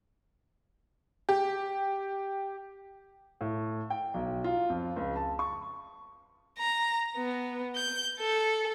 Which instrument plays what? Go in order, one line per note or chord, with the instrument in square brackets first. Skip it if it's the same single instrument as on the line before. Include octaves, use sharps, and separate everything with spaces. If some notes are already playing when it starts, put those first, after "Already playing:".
[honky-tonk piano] G4
[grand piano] A2
G5
B1
F4
F2
C#2
A5
C#6
[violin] A#5
B3
G6
A4